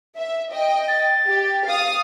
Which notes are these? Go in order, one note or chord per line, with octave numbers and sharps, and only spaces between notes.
E5
D#5 G5
A6
G4
F5 D#6